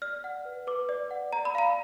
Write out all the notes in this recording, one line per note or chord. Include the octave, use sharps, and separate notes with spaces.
D5 F6
F#5
B4
B4 D6
D5
F#5
D5 A#5
B5
F5 A#5